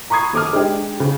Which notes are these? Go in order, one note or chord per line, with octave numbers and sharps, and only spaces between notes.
A#5 B5 C#6 D#6 G#6 C7
D#2 A4 D6 D#6 F6
G#3 D4 D#4 G4
C#3